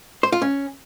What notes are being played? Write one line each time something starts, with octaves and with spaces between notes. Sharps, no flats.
C5
F4
C#4